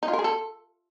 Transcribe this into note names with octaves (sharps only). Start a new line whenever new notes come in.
D#4
F4
A#4
G#4
A4